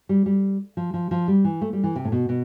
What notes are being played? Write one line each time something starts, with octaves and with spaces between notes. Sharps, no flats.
G3
G3
F3
F3
F3
G3
E3
A3
G3
E3
C3
A2
B2
B2